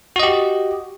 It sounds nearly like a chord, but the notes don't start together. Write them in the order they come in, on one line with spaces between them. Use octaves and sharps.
F#4 D#5 G4